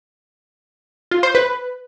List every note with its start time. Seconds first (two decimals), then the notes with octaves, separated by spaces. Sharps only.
1.11 F4
1.23 C5
1.35 B4